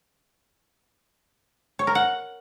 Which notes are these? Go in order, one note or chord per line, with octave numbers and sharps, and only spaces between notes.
C#5
A#4
F#5